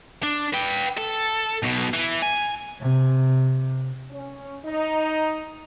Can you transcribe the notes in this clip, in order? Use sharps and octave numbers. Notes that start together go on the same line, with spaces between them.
D4
B4 G5
A4
B1 B2
E3
G#5
C3
C#4
D#4